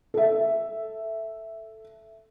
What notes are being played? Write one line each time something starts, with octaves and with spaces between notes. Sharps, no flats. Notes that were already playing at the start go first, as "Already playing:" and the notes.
A4 E5